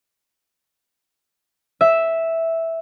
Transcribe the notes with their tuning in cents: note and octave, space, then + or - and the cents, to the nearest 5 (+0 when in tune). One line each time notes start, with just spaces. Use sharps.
E5 -5